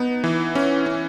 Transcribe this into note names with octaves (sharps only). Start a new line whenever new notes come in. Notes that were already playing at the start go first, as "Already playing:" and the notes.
Already playing: B3 D#4
E3
C#4
C#4